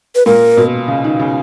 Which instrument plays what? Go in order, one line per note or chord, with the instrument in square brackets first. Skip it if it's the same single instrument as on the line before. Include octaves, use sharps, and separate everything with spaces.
[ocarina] B4
[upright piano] A#2 [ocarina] A#4
[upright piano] B2
C#3
D#3
C#3